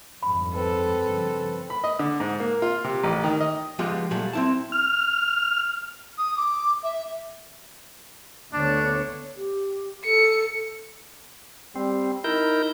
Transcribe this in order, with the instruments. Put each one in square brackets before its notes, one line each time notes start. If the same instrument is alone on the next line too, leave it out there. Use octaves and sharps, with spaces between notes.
[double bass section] G1 F2 G#2 [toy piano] B5
[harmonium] C4 B4 [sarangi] A4
[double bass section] G2 C#3 F3
[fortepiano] B5
D#5
D3
G#2
A#3
F4
C3
A1
D#3
D#5
[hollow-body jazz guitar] F3 G#3 B3 F4 G4
A#2 F#3 G3 A3
C4 E4 A5
[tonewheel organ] F6
[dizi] D#6
D6
E5
[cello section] D2 B3 C#5 [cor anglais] D4
[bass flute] G4
[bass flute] A4 [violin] C#7
[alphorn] G3 [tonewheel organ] C4
[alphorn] D#4 [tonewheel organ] E4 A#4 G6